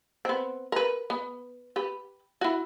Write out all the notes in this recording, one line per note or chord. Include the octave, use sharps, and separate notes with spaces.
B3 C4
A#4 B4
B3
G4 B4
E4 F#4